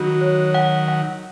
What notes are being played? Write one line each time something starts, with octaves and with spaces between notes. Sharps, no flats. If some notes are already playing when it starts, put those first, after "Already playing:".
Already playing: D#3 F#3 F#4
C#5
F#5
F#5